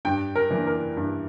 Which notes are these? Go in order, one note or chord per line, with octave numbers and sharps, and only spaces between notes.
G2 G5
A#4
E3 A#3 D4
A#4
G2